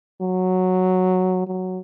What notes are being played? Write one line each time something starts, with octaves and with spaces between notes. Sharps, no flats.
F#3
F#3